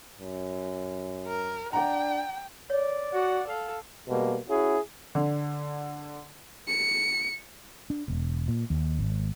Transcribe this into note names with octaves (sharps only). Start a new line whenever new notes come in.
F#2
A#4
D4 D5 F#5 G5 A#5
C#5 D5
F#4 F#5
A4 F5
B2 G3 G#3 A#3
C#4 E4 F#4 G#4
D3
C#7
D4
E1
A#2
D#2
G#1